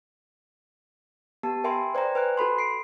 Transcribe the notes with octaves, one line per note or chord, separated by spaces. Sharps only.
B3 G4 A5
A#4 E5 G5 G#5 B5 C6
B4 C5 D5 G5 A#5
B4 G#5 F#6
F#4 A4 B5 C6
C7 D7